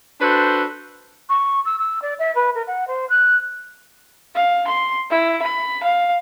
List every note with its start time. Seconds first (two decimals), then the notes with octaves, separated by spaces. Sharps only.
0.21 D4 F#4 A4 B4 C5 A5
1.29 C#6
1.65 E6
1.78 E6
2.02 D5
2.19 E5
2.35 B4
2.55 A#4
2.67 F#5
2.87 C5
3.09 F#6
4.35 F5
4.68 C6
5.10 E4
5.42 B5
5.83 F5